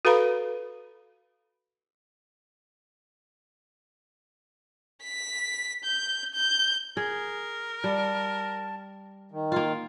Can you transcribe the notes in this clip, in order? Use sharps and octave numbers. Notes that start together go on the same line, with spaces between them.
F#4 A4 B4 F5 A#5 B5
B6
G6
G6
G#4 A#4
G3 A5
D#3
A#3 F4 F5